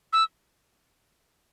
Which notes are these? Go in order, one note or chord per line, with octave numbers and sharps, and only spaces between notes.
E6